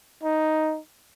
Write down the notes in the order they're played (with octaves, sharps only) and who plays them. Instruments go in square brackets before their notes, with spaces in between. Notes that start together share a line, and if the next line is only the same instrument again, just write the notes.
[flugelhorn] D#4